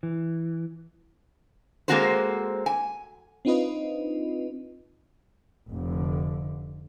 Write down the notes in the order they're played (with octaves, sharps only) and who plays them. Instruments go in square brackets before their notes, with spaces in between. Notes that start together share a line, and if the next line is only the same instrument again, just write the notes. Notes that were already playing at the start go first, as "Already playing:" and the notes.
[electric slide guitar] E3
[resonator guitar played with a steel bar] G#3 A#3 C4 F#4 A4 C5
G#5
[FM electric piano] C4 D4 D#4 F4 B4 D#5
[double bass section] F1 D3